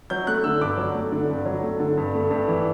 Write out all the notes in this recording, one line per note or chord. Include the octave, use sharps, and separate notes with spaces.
F#3 G6
A3 F#6
D3 E6
G2 D6
F#3
A3
D3
G2
F#3
A3
D3
G2
A3
G2
E3